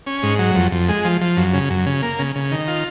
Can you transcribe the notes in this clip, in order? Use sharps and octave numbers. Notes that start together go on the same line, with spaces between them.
C#4
G#2
F#3
F2
F2
G#3
F3
F3
F#2
C#3
F#2
C#3
A#3
C#3
C#3
D#3
F4